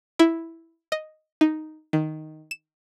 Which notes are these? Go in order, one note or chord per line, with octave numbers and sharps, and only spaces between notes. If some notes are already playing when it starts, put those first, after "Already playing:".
E4
D#5
D#4
D#3
E7